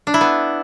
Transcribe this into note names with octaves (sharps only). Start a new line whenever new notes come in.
D4
E4
B3